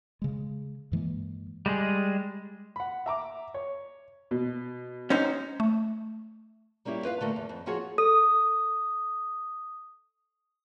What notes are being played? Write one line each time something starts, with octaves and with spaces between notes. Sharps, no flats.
C#3 G#3
G2 E3 G#3 A#3
G3 G#3 G#4
F#5 B5
E5 A#5 D6
C#5
B2
C#4 D#4 C5
A3
G3 A#3 C#4 E4 G4
F4 B4 D5 F5
D3 A3 A#3 A#4
E2
F2
F3 A#3 F4 F#4 G#4 C#5
A4 D#6